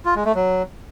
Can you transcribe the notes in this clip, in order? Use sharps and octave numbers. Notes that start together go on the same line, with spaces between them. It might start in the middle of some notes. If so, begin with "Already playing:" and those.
F4
G#3
A3
F#3